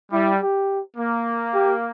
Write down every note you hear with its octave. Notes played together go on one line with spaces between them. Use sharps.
G3 E4
G4
A#3
G4